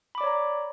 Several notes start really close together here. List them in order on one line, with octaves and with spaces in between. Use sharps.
B5 D6 D5 C#5 A#5